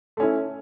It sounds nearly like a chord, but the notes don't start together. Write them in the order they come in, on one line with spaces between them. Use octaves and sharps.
A3 C#4 E4